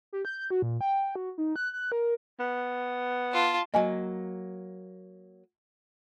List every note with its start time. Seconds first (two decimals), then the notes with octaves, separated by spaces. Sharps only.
0.13 G4
0.25 G6
0.50 F#4
0.62 A#2
0.81 G5
1.16 F#4
1.38 D#4
1.56 F#6
1.73 F#6
1.92 A#4
2.40 B3
3.33 F4 A5
3.74 F#3 A#3 D#5 G#5